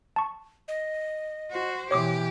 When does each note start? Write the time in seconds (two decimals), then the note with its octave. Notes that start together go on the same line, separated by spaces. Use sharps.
0.16 A5 C#6
0.68 D#5
1.51 F#4 C5
1.91 B2 E3 G4 C#5 D6 D#6